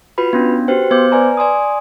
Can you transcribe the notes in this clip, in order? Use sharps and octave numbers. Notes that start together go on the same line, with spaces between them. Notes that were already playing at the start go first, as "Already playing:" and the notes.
F4 F#4 B4 B5
B3 C#4 D4
F#4 G4 B4 C5 G5
B3 C5 D6 G6
B4 D5 G#5 A#5
D5 G#5 C6 D#6